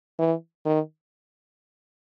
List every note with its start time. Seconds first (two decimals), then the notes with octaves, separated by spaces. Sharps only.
0.19 E3
0.66 D#3